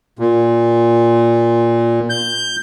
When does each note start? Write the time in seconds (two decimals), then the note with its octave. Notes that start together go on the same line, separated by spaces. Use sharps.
0.19 A#2
2.10 G6